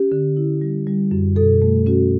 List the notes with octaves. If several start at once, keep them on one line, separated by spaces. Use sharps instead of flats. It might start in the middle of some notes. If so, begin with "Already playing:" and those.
Already playing: C#4 G4
D3
E4
G3
G3
F#2
B2 A4
A3
C#4 F#4